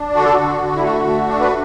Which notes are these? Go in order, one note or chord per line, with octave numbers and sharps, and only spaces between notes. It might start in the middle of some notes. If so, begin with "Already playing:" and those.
Already playing: D4
D3 F#4
A4
D3 F#4
D3
E4
A3 F#4
A3
D4
B4